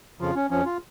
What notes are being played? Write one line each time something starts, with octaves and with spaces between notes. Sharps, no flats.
F2 C#3 F3 F4
C#4
F2 F3 C#4
F4